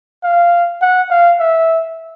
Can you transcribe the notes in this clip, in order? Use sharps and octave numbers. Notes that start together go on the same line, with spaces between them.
F5
F#5
F5
E5